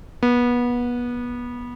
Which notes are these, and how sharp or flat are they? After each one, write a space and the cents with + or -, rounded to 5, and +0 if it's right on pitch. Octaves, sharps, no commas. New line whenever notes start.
B3 -25